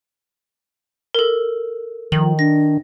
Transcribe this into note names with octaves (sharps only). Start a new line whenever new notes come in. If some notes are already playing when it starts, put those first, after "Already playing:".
A4 A#4
D#3 F3 F#7
D4 A#6